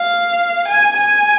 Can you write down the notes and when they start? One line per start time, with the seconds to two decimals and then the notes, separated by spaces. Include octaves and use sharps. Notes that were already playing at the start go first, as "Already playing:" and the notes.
Already playing: F5
0.69 G#5
0.97 G#5